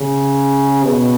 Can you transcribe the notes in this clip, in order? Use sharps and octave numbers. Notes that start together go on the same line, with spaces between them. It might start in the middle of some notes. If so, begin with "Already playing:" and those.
Already playing: C#3
B2